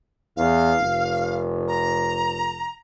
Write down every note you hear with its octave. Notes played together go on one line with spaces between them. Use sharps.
E2 F5
F1
A#5